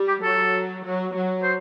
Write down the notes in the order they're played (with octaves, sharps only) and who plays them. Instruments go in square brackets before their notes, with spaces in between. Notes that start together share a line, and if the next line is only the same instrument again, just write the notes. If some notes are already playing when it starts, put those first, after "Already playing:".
Already playing: [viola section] G3
[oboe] G4
[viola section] F#3 [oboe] A4
[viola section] F#3
F#3
[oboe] C5